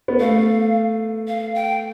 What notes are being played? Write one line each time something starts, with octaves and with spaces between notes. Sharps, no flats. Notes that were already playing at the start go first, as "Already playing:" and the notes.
B3
A3 F5
F5
G5